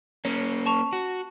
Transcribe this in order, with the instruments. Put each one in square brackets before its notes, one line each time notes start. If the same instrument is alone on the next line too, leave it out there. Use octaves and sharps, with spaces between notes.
[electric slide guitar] A#3 C#4 [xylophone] C#5
[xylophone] A5 C#6 F7
[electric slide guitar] F#4